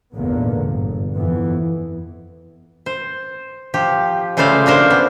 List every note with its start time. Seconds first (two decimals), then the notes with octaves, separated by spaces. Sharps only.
0.15 G#1 E2 A#2 D3 A#3 B3
0.65 G1
1.14 F2 E3 B3
2.86 C5
3.74 F3 G4
4.37 C#3 G#3 A3 C5 D5 F5
4.66 A#3 D4 A#4 C5
4.90 B3